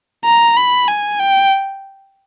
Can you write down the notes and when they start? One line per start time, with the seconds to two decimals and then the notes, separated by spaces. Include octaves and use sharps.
0.25 A#5
0.57 B5
0.88 G#5
1.19 G5